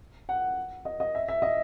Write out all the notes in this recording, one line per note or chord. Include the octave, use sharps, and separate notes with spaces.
F#5
D#5
D#5
E5
E5
D#5